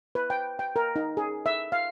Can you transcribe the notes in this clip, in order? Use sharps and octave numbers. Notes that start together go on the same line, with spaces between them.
B4
G5
G5
A#4
D#4
G#4
E5
F5